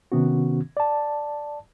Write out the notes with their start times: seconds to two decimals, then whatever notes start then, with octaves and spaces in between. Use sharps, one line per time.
0.12 C3 D#3 B3 C#4 F#4
0.77 D5 A5